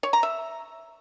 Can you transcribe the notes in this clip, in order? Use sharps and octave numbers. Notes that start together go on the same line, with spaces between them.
C#5
A#5
E5